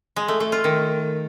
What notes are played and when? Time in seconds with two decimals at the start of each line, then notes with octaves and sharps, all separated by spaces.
0.16 G#3
0.28 A3
0.40 A3
0.52 F4
0.64 D#3